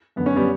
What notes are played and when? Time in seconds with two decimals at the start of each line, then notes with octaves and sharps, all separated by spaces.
0.16 F#2 D3 B3
0.26 C#4
0.36 G3 B3